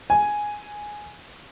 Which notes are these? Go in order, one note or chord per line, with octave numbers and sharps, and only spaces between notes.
G#5